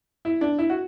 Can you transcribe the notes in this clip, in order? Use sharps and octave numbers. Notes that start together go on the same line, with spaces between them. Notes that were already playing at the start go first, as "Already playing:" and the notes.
E4
D4
E4
F#4